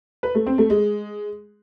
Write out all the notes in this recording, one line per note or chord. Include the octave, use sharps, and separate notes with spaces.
B4
A3
C4
A3
G#3